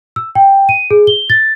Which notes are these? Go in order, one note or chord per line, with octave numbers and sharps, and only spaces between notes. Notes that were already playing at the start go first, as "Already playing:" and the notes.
E6
G5
D#7
G#4
G7
A6